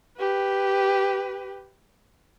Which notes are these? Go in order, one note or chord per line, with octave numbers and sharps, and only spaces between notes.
G4 B4